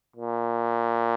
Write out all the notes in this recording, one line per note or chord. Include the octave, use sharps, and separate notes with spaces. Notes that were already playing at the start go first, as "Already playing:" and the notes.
A#2